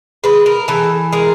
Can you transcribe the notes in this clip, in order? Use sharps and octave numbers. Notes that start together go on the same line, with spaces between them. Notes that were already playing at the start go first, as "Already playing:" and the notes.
G#3 B4
A#4
E3 A4
G#3 A#4